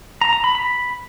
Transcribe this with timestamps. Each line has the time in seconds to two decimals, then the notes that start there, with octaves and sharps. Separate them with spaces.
0.21 A#5
0.33 A#5
0.44 B5
0.55 B5